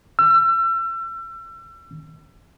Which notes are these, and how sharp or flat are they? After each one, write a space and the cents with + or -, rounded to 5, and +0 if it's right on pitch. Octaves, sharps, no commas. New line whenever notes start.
E6 +35